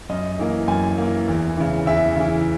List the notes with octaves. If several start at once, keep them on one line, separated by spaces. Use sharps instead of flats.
F#2 D#5
E3 A#3
F#2 G#5
E3 A#3
E2
C#3 E3
E2 E5
C#3 E3